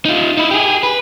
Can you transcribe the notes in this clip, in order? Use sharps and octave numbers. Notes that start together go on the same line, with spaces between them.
D#4 F4
D#4 E4
G4 G#4
B4